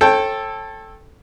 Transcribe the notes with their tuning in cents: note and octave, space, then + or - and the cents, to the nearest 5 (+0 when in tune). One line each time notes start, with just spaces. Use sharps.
A4 +0 C#5 -40 G5 +0